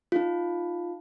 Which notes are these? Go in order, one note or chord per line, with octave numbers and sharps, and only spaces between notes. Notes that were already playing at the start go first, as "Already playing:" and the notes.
D#4 F4